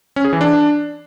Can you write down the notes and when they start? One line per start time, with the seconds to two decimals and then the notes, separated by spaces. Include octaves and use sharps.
0.16 C#4
0.25 G#4
0.33 E3
0.41 D4